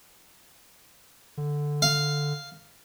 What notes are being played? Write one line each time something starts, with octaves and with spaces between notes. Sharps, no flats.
D3
F5